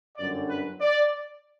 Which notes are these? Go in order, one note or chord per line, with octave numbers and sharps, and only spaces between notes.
G1 F#2 D3 D5
B4
D5